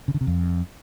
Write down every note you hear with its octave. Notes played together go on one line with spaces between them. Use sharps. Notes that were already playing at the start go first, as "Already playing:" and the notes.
C#3
D3
C3
F2